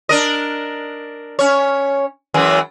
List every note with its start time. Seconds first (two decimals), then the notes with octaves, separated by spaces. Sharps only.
0.09 D4 A#4 D#5
1.39 C#4 C#5
2.34 F#2 E3 G#3